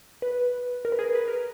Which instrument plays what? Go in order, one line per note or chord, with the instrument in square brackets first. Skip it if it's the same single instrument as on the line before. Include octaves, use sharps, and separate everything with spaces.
[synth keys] B4
A#4
B4
G#4
A#4
B4
A#4